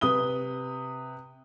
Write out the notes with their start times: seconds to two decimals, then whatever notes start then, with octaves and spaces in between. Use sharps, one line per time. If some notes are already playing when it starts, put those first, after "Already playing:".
0.01 C3 B4 D#6 G7